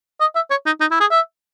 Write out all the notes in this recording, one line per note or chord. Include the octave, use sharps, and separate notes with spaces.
D#5
E5
C#5
D#4
D#4
E4
G#4
E5